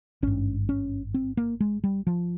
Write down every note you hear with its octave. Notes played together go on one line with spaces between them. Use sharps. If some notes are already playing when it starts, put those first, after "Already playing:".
G#1 G2 C#4
C#4
C4
A#3
G#3
G3
F3